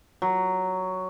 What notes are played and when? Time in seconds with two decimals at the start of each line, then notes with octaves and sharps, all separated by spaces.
0.22 F#3